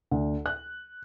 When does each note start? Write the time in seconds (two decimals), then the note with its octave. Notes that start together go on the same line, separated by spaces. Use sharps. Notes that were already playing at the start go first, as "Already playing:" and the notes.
0.11 D2
0.46 F#6